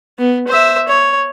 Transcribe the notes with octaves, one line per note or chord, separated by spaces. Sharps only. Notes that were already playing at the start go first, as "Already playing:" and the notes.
B3
C5 E5
C#5